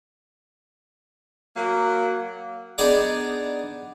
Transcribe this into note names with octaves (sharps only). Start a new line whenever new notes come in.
F#3 A#3
B3 D4 D#4 G#4 D5